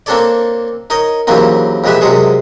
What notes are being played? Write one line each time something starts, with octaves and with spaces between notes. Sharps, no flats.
A#3 C4 D4 A4 C#5 D5
D#4 A#4 C#5 D#5
D#2 C#3 E3 F#3 A#3 C4
F2 A#2 G#3 G4 B4 E5
F#2 C3 G#3 G#4 C#6